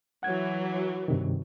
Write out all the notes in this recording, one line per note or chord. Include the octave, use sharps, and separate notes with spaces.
E3 F#3 F#5 G#6
G2 C3 D#3